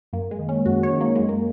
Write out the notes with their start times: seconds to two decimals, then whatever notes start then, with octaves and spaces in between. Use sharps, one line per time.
0.13 F#2 A#3
0.31 G#3
0.39 D#3
0.49 C#4
0.65 F#2 F#4
0.83 C#5
0.93 D#3
1.01 A#3
1.15 F#2 G#3
1.29 A#3